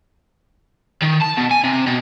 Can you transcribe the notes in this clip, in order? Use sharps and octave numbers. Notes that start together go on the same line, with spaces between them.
D#3
A5
B2
G#5
C3
B2